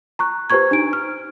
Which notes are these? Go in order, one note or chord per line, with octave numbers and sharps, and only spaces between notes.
A#5 C#6 F#6
G4 B4 C5 A#5 C#6 G#6
D4 D#4 D7
F6